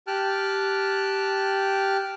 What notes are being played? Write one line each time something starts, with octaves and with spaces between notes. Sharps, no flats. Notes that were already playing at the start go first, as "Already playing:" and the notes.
G4 G5 A5 F6 F#6